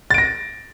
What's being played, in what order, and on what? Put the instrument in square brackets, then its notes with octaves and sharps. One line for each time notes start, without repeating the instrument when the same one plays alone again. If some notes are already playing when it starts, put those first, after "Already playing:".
[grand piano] A6
D7
A#6